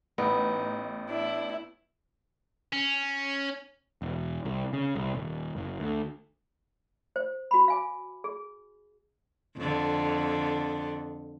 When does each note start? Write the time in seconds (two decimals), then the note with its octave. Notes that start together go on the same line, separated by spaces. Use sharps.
0.18 A1 B3 D#4
1.10 D4 E4
2.73 C#4
4.02 E1
4.45 C2
4.73 C#3
4.95 C2
5.15 D#1
5.56 F#1
5.80 D2
7.16 C5
7.51 F#4 B5
7.68 F5 G#5 D6
8.24 G#4
9.58 F2 D3